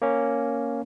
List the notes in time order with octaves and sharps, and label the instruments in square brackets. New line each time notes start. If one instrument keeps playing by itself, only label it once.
[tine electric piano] A#3 C#4